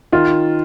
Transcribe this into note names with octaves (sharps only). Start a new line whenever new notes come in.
D#3 F4